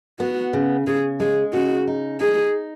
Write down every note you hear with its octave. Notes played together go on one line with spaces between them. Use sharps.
B3 F#4
C#3
C#3 G#4
G#3 G#4
C#3 F#4
D#4
D#4 G#4